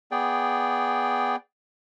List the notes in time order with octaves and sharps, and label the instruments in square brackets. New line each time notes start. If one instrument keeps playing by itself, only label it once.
[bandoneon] B3 G#4 D5 G5